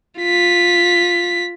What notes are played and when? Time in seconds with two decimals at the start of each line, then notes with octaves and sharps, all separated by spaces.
0.19 F4 B6